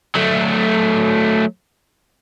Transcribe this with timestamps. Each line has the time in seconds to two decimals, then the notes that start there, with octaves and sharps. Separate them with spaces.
0.16 F#3 A3